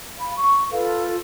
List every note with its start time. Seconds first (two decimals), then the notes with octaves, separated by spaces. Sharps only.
0.19 F5 B5
0.37 C#6
0.71 F4 A4 B4 F5